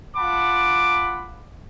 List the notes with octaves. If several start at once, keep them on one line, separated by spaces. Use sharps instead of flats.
F4 F#5 A5 B5 D6